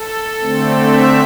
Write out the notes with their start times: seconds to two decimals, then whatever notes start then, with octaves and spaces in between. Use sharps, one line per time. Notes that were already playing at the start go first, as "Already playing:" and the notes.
Already playing: A4
0.41 D3 A3 C4
0.90 E5